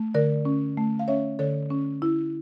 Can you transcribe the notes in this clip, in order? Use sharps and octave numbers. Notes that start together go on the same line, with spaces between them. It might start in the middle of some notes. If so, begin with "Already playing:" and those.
Already playing: A3
D3 A#4 D5
C#4
A3
F5
C#4 C#5 E5
D3 A4 C#5
C#4
E4